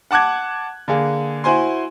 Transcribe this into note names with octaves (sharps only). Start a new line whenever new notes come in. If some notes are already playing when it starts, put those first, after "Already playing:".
F#5 A5 D6 F#6 G#6
D3 A#3 G#4
E4 F#4 C5 G#5 C6